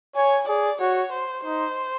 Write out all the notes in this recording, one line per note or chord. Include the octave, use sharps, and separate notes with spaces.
C#5 G#5
G#4 D5
F#4 C#5
C5
D#4 C5